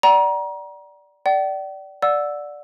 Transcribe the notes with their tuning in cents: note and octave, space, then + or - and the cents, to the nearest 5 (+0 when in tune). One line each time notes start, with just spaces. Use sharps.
D5 +0 F#5 +40 A#5 +30
D5 +0 G5 -45
D5 +0 F#5 -25 E6 +0